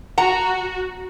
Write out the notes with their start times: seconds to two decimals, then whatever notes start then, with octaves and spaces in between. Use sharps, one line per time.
0.18 F#4 F#5 A#5